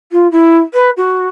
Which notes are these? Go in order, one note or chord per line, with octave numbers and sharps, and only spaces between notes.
F4
E4
B4
F#4